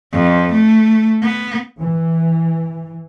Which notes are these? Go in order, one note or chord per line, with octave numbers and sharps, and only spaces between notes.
F2
A3
B3
E3